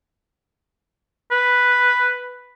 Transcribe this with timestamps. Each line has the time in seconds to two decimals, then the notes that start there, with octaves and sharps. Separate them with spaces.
1.31 B4